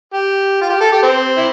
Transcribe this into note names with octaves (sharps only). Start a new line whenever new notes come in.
G4
F4
G4
A4
G4
C4
E4